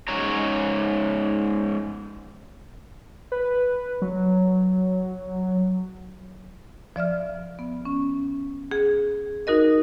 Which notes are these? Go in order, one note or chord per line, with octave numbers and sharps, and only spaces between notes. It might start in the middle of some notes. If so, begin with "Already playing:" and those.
G#2 G#3 C#4 C#5 A#5
B4
F#3
F3 D5 E5 F6
B3
C#4
G#4
D#4 F#4 A#4 D#5